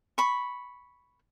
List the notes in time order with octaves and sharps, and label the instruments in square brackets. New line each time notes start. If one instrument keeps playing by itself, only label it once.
[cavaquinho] B5 C#6